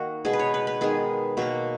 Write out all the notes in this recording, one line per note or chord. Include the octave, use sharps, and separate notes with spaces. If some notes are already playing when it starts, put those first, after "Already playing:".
Already playing: D#3 A#3 F#4
B2 G#3 B3 G#4
B4
C#5
B4
B4
D#3 G#3 B3 G#4
B2 F#3 A#3 F#4